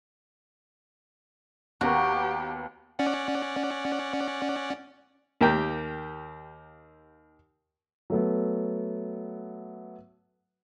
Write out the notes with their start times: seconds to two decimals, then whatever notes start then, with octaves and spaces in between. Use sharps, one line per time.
1.81 D#2 B3 F#4 G4 A#5
2.99 C#4 D5 F#5
5.41 D#2 A#3 G4 A#4 G5
8.10 F#3 A3 B3